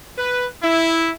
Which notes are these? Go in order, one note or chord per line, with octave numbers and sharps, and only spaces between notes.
B4
E4